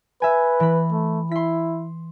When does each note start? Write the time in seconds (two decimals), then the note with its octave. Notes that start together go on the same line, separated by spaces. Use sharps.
0.22 B4 E5 G#5
0.60 E3 B5
0.92 A3
1.31 E4 C6 B6